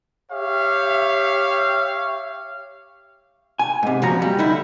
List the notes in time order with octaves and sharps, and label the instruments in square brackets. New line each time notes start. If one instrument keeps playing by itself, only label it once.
[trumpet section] G4 C#5 E5 F5
[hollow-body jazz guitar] G#5
G#2 C3
A#2 F3 C#4 F#4 A#5
G3
D3 D#4 E4